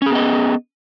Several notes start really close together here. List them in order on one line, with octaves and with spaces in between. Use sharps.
C#4 G#4 B3 D#5